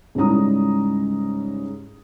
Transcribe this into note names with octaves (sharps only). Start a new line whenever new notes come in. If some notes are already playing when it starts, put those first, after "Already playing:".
G#2 C#3 G3 E4 A#5 D#6